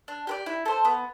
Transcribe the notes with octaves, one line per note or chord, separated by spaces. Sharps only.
D4
G4 B4 D5
E4
A4 C5
B3